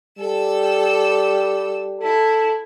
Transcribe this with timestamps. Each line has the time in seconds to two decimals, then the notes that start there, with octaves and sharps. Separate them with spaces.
0.19 G3 A4 E6
2.01 E4 A4